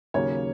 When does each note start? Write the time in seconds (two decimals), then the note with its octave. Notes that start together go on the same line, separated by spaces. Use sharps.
0.14 D#2 C#3 F#3 A#3 C#4 C#5